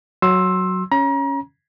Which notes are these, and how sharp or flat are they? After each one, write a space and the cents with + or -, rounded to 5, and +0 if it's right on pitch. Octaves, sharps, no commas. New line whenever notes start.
F#3 +0 C6 +20 E6 +0
C#4 +0 A#5 +35